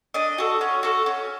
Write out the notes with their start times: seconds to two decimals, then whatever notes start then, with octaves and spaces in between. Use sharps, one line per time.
0.14 D4 D#5
0.38 F#4 A4
0.61 C#4
0.83 F#4 A4
1.06 C#4